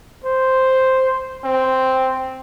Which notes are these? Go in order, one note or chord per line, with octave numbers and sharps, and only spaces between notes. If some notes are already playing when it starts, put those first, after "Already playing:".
C5
C4